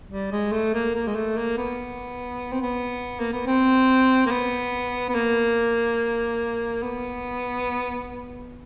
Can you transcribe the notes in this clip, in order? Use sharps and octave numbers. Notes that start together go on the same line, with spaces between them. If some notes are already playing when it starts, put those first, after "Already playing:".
G3
G#3
A3
A#3
A#3
G#3
A3
A#3
B3
C4
B3
A#3
B3
C4
A#3
B3
B3
A#3
B3